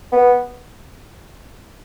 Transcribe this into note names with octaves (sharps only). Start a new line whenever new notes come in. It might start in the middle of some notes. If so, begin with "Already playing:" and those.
B3